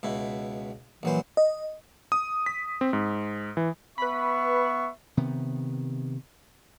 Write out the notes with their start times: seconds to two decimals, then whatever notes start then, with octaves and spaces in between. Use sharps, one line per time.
0.03 C#2 B2 E4
1.03 A#1 E3 F#3 C5
1.37 D#5
2.12 D#6
2.46 B6
2.81 C4
2.93 G#2
3.57 E3
3.98 B3 B4 E5 B5 C#6
5.17 C3 D#3 B3